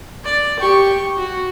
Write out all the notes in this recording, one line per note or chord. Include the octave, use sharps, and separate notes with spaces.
D5
G4 C#6
F#4